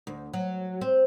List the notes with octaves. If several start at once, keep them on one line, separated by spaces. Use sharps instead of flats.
D2
F#3
C4